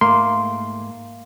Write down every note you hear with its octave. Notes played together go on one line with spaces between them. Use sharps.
G#2 A3 A#3 C6